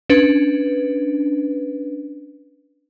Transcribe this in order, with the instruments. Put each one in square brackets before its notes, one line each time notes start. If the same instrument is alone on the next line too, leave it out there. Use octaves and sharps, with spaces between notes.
[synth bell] C#4 D4 B4